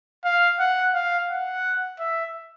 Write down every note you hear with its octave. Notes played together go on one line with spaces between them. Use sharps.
F5
F#5
F5
F#5
E5